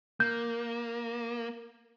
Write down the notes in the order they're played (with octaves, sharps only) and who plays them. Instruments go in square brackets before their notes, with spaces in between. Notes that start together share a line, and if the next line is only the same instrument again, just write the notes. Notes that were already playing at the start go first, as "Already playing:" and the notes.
[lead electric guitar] A#3 [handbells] G6